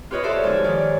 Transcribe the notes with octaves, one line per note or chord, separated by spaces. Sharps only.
F4 G4 B4 C#5 D#5
F#4 G4 A4 C5 D5 E5
G#2 F3 G4 G#5
D#3 C#5 D5